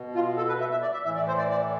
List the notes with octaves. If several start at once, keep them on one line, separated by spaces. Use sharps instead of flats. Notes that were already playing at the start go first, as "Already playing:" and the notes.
Already playing: B2
F4
A4
B4
E5
E5
D5
E5
A2 E3 E5
D5
C5
D5
D5